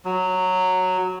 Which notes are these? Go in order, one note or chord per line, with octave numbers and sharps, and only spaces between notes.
F#3